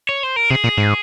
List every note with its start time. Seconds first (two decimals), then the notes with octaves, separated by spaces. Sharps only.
0.09 C#5
0.23 C5
0.36 A#4
0.50 C3 G#4
0.64 A#2
0.77 G#2